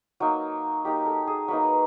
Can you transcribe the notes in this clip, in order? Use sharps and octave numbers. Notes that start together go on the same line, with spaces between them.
F#3 A#3 D#4
F#3 A#3 D#4 G4
A4
G#4
F#3 A#3 D#4 B4